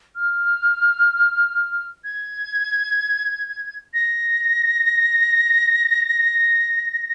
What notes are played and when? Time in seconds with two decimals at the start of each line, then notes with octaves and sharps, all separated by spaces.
0.15 F6
2.04 G#6
3.94 A#6